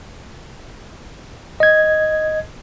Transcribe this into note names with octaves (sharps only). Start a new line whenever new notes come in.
D#5 G#6